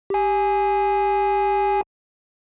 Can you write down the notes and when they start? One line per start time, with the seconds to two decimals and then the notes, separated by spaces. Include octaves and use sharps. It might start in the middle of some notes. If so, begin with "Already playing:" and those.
0.10 G4 G#5